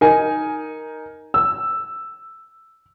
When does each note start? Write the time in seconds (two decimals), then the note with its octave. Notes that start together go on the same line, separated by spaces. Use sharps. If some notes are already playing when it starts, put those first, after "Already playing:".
0.01 D#4 A#4 G#5
1.34 E6